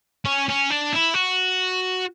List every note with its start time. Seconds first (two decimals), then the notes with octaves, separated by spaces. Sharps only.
0.25 C#4
0.48 C#4
0.70 D4
0.93 E4
1.14 F#4